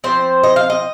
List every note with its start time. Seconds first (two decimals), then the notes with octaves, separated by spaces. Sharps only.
0.04 F3 C4 C5
0.44 D#5
0.56 F5
0.70 D#5